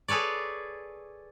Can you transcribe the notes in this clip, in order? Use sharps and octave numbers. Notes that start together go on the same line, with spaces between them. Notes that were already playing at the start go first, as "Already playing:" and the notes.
G#4 A4 B4 C#5 D5